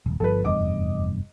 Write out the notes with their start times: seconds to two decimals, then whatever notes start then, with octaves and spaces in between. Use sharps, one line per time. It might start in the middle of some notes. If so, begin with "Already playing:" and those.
0.06 D#1
0.20 G1 F3 A4 B4
0.44 F1 E2 G2 D#5 D6